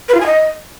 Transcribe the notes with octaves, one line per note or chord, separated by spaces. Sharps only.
B4
F4
G#5
D#5